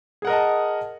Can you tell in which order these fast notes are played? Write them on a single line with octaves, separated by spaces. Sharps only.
G#4 F#5 A#4 D#5 A5